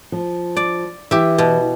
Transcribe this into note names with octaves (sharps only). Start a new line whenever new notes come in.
F3
D5
E3 G4 E5
B2